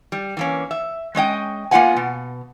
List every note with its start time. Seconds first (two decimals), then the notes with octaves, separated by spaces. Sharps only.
0.12 G3
0.37 E3 A#3 C#4
0.71 E5
1.15 G#3 C#4 D#5 G5
1.71 A#3 B3 F4 D#5 F#5 G#5
1.97 B2